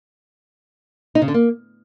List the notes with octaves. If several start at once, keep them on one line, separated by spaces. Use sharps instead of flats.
D#4
C#3
D3
A#3